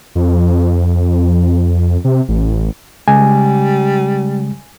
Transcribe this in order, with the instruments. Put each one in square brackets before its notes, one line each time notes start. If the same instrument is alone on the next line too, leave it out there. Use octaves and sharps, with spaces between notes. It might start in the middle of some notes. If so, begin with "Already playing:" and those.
[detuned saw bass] F2
C3
A1
[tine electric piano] C#3 G#3 [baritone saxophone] G3 [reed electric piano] G#5